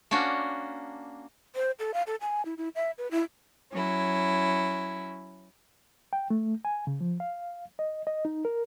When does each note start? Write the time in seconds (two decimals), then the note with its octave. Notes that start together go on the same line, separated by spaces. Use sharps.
0.11 A#3 C#4 D4 F#4
1.55 C5
1.79 A4
1.94 F5
2.07 A4
2.21 G#5
2.45 E4
2.58 E4
2.75 E5
2.98 B4
3.11 E4
3.72 F#3 C#4 E4
6.13 G5
6.30 A3
6.65 G#5
6.87 C#3
7.01 F3
7.20 F5
7.79 D#5
8.07 D#5
8.25 D#4
8.45 A#4